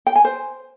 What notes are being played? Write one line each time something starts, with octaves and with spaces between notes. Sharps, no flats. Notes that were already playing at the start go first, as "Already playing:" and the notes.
G5
G#5
C5